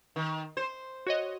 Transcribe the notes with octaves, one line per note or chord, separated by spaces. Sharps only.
D#3
C5
F#4 C#5 D#5